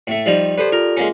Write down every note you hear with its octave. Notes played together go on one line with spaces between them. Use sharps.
A2 A3
F3 G3 D#4 G4
G4 A4 B4 C5 D5
F4 A#4
G#3 A#3 C#4